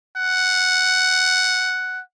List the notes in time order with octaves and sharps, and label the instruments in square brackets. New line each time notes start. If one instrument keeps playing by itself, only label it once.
[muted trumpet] F#5